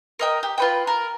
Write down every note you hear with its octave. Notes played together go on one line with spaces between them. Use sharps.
A#4 D#5 G5
G4
F4 B4 G5
A#4